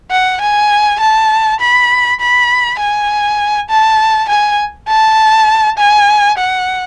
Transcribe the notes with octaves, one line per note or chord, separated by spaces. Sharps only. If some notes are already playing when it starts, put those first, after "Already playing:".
F#5
G#5
A5
B5
B5
G#5
A5
G#5
A5
G#5
F#5